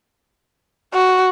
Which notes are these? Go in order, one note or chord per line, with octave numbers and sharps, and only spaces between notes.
F#4